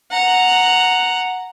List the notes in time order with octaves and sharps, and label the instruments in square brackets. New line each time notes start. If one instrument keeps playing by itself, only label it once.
[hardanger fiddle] F#5 A#5